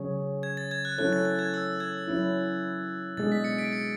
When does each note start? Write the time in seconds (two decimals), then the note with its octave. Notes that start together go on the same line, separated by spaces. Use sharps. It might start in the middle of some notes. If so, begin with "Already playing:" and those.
Already playing: C#3 F#3 C#4 G#4 C#5
0.43 G#6
0.57 A6
0.71 G#6
0.85 F#6
0.98 F#3 C#4 E4 A4 C#5 F#6
1.13 A6
1.25 A6
1.39 G#6
1.54 E6
1.80 G#6
2.08 F#3 C#4 E4
3.17 B2 G#3 D4 G#4 A6
3.32 B6
3.44 A6 C#7
3.58 B6 D7
3.72 A6 C#7